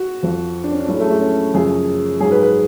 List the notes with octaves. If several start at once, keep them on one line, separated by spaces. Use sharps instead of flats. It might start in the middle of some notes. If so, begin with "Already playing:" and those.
Already playing: F#4
F2 F3
D4
C#4
D4
A2 F#3 C#4
G#3
A3
A3
C#4
F#2 C#3 F3 G#4
G#2 F#3 G#4
B4
B4